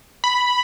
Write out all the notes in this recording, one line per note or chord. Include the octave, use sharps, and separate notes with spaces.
B5